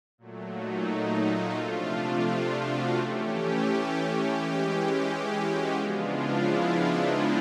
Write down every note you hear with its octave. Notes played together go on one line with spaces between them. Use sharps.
A#2 F#3 A3
D#4
F4
C3 F3 A3 D4
F4
F#4
E3 A3 C#4 G4
G4
E3 G#3 C#4 G4
F#4
C#3 F3 G#3 B3 D4 F4
E4
D#4